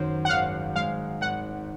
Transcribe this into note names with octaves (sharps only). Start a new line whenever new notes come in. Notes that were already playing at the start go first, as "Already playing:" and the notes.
Already playing: F#2 D#3 C5
F#5
G#1 F5
G#3 F5
G#1 F#5